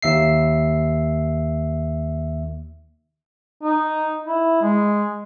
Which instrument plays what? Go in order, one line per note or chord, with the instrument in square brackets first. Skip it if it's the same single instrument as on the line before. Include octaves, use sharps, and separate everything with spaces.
[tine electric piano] D#2 E5 C7
[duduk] D#4
E4
G#3